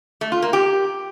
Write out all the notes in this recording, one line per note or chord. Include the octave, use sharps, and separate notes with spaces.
A3
F4
A#3
G4